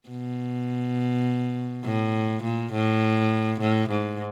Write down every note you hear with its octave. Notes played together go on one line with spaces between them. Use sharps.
B2
A2
A#2
A2
A2
G#2